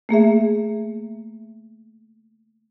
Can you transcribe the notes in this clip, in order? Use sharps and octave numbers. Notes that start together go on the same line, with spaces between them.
A3 A#3 G#4 E5